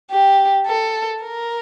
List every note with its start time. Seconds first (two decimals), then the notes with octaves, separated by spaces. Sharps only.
0.11 G4
0.67 A4
1.23 A#4